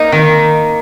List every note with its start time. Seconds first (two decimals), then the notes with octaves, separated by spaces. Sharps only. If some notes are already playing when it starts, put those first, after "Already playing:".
Already playing: A#3 D#4
0.12 D#3